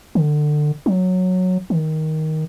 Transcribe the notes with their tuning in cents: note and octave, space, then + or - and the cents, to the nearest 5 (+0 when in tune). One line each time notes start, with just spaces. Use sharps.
D3 +25
F#3 -10
D#3 +10